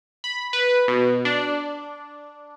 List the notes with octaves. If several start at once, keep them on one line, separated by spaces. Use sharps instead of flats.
B5
B4
B2
D4